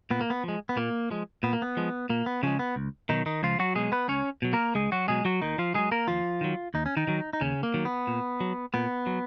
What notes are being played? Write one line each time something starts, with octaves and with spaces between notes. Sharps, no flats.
A#2 B3
A#3
B3
F3 G#3
B3
A#2 A#3
F3 G#3
A#2 B3
A#3
B3
F3 G#3
A#2 A#3
B3
C#3 F3 G#3 C#4
B3
C#2
B2 D#3 F#3 D#4
D#3 D#4
C#2 F3 F4
F#3 F#4
B2 F#3 G#3 G#4
B3 B4
C#2 C#4 C#5
B2 F#3
A#3 A#4
C#2 G#3 G#4
F#3 F#4
B2 F#3 G#3 G#4
F#3 F#4
D#2 D#3 D#4
F3 F4
D#3 F#3 G#3 G#4
A#3 A#4
D#2 F3 F4
D#3 F#3
D#2 D#4
C#4
D#3 D#4
D#3 F#3
D#4
D#2 C#3 C#4
A#3
D#3 F#3
B3
A#2
F#3
A#2 B3
F#3